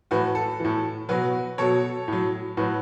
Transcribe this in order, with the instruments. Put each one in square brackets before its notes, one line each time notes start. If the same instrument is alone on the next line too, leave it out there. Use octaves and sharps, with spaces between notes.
[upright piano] A2 E3 F#4 B4
A4
A2 E3
B2 F#3 F#4 B4
B2 F#3 A4 C#5
A2 F#3
A2 F#3 F#4 B4